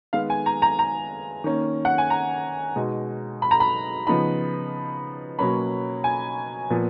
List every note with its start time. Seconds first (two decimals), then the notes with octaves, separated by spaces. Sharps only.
0.13 D#3 G#3 B3 F5
0.30 G#5
0.46 A#5
0.62 A#5
0.79 A#5
1.44 D#3 A#3 C#4
1.85 F#5
1.98 G#5
2.10 A#5
2.76 B2 G#3 D#4
3.42 B5
3.51 A#5
3.60 B5
4.07 C#3 F3 B3 D#4 B5
5.39 B2 F#3 A#3 C#4 B5
6.04 G#5
6.70 A#2 F3 B3